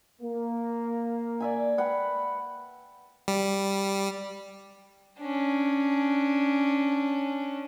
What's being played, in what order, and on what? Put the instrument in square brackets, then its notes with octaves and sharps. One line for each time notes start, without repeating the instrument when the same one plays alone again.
[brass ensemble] A#3
[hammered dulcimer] D5 E5 G#5
B4 F#5 G5
[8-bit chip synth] G3
[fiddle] C#4 D4